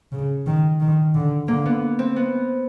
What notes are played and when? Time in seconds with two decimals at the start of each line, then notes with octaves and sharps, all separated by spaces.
0.12 C#3
0.46 D#3
0.80 D#3
1.15 D3
1.48 D3 A#3
1.66 B3
1.99 C4
2.16 B3